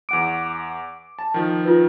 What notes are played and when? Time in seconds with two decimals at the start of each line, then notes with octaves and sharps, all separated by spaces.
0.09 E2 F#5 D6 D7
1.19 A5
1.34 D#3 F3
1.64 F4 B4